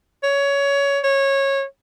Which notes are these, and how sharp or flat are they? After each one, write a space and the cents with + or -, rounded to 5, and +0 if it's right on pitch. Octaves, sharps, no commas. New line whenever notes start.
C#5 +20
C#5 -20